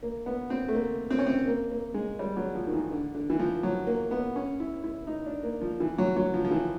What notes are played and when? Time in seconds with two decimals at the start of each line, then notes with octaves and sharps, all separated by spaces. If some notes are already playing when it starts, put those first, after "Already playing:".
0.03 A#3
0.26 B3
0.50 C4
0.68 A3
0.75 A#3
1.10 C4
1.19 C#4
1.27 C4
1.47 A#3
1.71 A#3
1.94 G#3
2.19 G3
2.37 F#3
2.55 F3
2.67 D#3
2.73 E3
2.91 D3
3.15 D3
3.30 E3
3.40 F3
3.63 F#3
3.87 A#3
4.11 B3
4.36 C#4
4.60 E4
4.84 E4
5.07 D#4
5.26 D4
5.43 A#3
5.61 F3
5.80 E3
5.98 F#3
6.16 F#3
6.34 F3
6.44 F3
6.51 E3